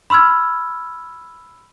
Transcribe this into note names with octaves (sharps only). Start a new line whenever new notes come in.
B5 C6 E6 F6 G#6